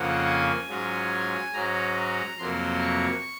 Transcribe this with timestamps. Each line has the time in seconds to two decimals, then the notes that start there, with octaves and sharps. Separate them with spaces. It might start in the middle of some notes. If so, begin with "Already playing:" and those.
Already playing: F2 C#3 F3 A#3 C#4 F#5
0.26 G#5
0.69 G#2 F#3 C#4 F4
1.53 G#2 F#3 C#4 A#5
2.38 F2 C3 F#3 A#3 C6
2.81 C#6